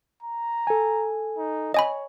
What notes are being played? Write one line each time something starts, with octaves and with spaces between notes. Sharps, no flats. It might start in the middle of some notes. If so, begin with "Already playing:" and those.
A#5
A4 G#5
D#4
C#5 D#5 G#5 B5